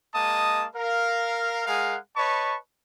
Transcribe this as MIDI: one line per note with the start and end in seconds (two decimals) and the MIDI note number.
0.14 0.65 56
0.14 0.65 58
0.14 0.65 75
0.14 0.65 81
0.14 0.65 87
0.75 1.63 70
0.75 1.63 77
1.66 1.96 56
1.66 1.96 68
1.66 1.96 70
1.66 1.96 77
1.66 1.96 78
2.16 2.56 71
2.16 2.56 73
2.16 2.56 75
2.16 2.56 81
2.16 2.56 83
2.16 2.56 85